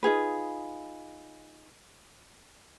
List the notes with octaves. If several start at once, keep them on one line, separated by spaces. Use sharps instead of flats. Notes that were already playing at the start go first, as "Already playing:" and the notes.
D#4 F4 G#4 B4